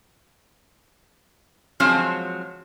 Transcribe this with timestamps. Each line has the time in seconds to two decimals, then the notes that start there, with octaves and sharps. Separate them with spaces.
1.80 F3 F#3 G#3 C4 C5 C#5